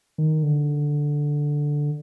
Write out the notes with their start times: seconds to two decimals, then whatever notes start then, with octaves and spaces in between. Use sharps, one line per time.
0.18 D#3
0.43 D3